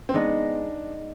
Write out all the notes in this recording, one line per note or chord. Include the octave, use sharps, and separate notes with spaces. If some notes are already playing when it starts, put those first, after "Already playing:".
C4
G#3 B3 D4 D#4